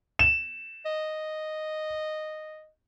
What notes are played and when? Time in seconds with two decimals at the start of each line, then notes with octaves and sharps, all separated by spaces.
0.19 E7
0.86 D#5